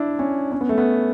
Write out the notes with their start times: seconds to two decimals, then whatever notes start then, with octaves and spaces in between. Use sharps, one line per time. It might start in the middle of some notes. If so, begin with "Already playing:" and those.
Already playing: D4 E4
0.19 C#4
0.52 C#4
0.61 B3
0.69 A3
0.78 B3